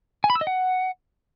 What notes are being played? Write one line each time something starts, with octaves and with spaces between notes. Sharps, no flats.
G#5
B5
E6
D#5
F#5